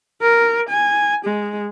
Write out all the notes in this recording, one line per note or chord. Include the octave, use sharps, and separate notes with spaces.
A#4
G#5
G#3